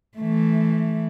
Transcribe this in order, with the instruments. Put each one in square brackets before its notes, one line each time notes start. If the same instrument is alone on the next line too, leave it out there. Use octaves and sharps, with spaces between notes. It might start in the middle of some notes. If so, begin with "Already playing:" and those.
[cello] E3 A3